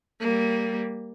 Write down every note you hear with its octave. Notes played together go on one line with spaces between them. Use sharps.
G3 A#3